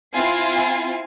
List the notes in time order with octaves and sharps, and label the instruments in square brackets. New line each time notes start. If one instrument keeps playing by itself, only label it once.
[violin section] C4 E4 F4 F5 G#5 C7